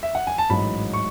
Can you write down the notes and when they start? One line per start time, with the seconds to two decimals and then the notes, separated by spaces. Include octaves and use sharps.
0.03 E5
0.15 F#5
0.27 G#5
0.38 A5
0.50 A1 G#2 F#3 B5
0.93 C#6